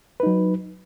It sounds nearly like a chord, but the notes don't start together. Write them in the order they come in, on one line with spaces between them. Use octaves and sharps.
B4 D#4 F#3